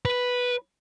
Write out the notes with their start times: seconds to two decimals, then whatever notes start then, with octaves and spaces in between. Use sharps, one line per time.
0.05 B4